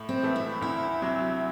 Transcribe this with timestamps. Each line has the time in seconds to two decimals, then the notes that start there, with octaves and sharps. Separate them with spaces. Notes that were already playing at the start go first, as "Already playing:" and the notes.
Already playing: A2
0.09 C4
0.22 E3 A3
0.36 E4
0.61 D2 E4
1.02 C3 F#3